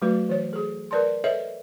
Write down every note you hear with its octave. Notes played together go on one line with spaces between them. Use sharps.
F#3 A3 F#4 B4
E3 C#5
G#4 A4
A#4 B4 D5 A5 C6
A4 B4 C#5 D#5 E5